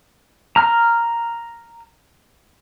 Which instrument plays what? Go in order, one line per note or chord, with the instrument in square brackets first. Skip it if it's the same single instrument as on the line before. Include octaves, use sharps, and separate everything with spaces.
[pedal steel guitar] A#5 F6